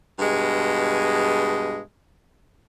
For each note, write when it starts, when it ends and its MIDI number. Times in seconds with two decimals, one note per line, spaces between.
0.19 1.79 43
0.19 1.79 47
0.19 1.79 56